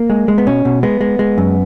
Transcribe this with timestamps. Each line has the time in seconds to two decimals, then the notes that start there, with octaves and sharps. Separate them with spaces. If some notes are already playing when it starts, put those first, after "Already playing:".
Already playing: A#3
0.10 G#3
0.28 G#3
0.38 B3
0.47 B2 C#4
0.65 B2
0.83 G#3 B3
1.01 G#3
1.19 G#3
1.38 F#2